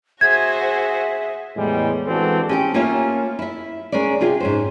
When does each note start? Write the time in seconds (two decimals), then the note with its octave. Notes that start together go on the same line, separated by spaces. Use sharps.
0.21 F#4 G#4 C5 E5 F#5 G#6
1.57 E2 A2 G3 G#3
2.07 E3 G#3 C4 D4 F#4 A4
2.49 C#4 G4 G5
2.74 A#3 C#4 F4 A#4 C#5 E5
3.39 E4 E5
3.92 G#3 C#4 A#4 D5
4.21 C3 F4 G#4
4.40 G#2 C#4 C5